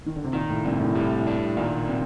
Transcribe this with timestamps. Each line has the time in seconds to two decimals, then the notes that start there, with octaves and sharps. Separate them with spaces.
0.06 D#3
0.16 D3
0.24 C3
0.33 A#2 D#3
0.50 A2
0.65 G2 C3
0.80 A2
0.95 A2 G3
1.27 D4
1.57 A#2 D#3
1.87 C3